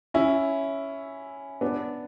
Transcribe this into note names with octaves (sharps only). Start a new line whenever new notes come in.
C#4 E4
B3 D4